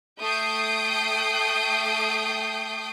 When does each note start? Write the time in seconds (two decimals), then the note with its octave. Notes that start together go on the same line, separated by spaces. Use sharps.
0.21 A3 G5 D#6 G6 C7 D7